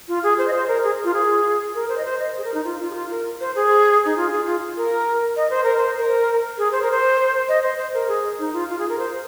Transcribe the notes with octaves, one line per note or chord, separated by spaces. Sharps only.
F4
G#4
C5
D#5
C5
A#4
G#4
F4
G#4
A#4
C5
D#5
C5
D#5
G#4
A#4
D#4
F4
F4
G#4
F4
A#4
C5
G#4
D#4
F4
G#4
F4
A#4
D#5
C5
A#4
C5
A#4
G#4
C5
A#4
C5
D#5
C5
C5
A#4
G#4
D#4
F4
F4
G#4
A#4
C5